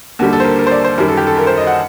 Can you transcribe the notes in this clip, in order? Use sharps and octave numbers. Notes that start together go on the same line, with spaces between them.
D#2 D3 G3 F#4
A4
C5
A#4
A#4
C5
D5
C5
F#2 D#3 G3 A#4
A4
G4
A4
A#4
C5
D#5
F#5